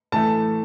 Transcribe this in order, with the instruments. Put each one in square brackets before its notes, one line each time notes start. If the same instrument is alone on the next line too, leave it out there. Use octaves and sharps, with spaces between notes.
[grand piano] A2 E3 A3 A5